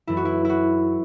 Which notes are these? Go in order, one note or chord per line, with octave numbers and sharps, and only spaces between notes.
F#2 E3 A3 E4
F#4
E4
E4 F#4